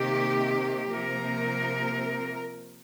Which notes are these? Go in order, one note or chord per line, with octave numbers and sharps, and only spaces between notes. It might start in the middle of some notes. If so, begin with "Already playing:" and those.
Already playing: C3 D#3 A#3 G4
C3 F3 A#3 A#4